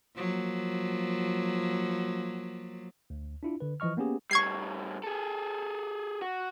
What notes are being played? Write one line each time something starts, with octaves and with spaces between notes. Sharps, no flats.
F3 F#3 A#3
D2
D4 E4 F4
D3 B4
E3 F3 D#5 C#6 F6
A#3 B3 C#4 G4 G#4
A2 G3 C#6 G#6 C7
G#4 A4
F#4